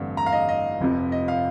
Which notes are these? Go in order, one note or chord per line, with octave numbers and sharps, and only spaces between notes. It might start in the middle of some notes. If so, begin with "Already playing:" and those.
Already playing: A1 G2 D3 A3 C4
A#5
F5
D#5
D#5
F1 F2 C3 F3
D#5
F5